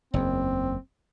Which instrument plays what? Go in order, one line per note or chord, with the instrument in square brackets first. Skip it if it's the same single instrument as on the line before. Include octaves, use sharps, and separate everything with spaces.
[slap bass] F#1 E2 [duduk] C4